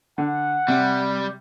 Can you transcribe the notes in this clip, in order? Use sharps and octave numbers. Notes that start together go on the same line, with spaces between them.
D3 F#5
C3 G3